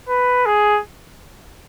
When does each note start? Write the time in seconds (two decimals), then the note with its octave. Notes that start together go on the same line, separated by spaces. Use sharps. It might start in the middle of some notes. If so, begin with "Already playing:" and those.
0.09 B4
0.46 G#4